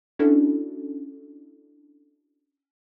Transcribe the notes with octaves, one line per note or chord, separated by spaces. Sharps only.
C#4 D4 E4 F#4 A4